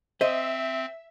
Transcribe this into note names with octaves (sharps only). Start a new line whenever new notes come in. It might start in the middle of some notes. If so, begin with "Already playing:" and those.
C4 C5 D#5 E5